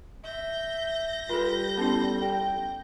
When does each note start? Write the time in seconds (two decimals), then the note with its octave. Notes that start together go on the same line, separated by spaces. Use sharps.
0.24 E5 G6 A#6
1.29 G3 F4 A4 B4
1.77 B3 C#4 E4 A4
2.22 A4 G5